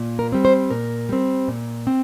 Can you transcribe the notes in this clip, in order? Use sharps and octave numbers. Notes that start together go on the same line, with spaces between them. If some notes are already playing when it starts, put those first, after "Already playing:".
Already playing: A#2
A#4
G3 C4
C5
A#2 A#4
G3 C4
A#2
C4